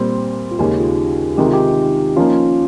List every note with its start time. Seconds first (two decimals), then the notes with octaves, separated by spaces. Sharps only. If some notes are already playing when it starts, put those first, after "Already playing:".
Already playing: A#2 G3 C4
0.51 F4
0.59 D#2 C#3 G#3 C#4 D#4 G4
0.79 F4 G#4
1.38 C3 D#3 G#3 G4
1.47 F4
1.53 D#4 G4
2.16 F3 A#3 C#4 D#4 F4